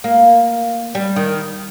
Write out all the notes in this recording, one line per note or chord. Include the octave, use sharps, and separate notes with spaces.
A#3
G3
D#3